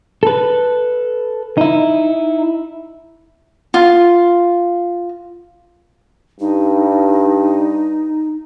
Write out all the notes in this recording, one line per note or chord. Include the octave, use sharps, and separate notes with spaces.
A4 B4
D#4 E4
F4
G2 D#4